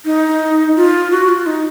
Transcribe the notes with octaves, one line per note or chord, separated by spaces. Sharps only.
D#4
F4
F#4
F4
D#4